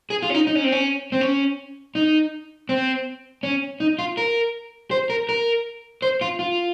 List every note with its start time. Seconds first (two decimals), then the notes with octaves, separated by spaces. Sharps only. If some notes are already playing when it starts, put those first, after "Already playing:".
0.10 G#4
0.22 F4
0.30 C#4
0.34 D#4
0.47 D#4
0.55 C#4
0.64 C4
0.72 C#4
1.12 C4
1.21 C#4
1.95 D#4
2.69 C4
3.43 C#4
3.80 D#4
3.99 F4
4.17 A#4
4.91 C5
5.10 A#4
5.29 A#4
6.02 C5
6.21 F4
6.39 F4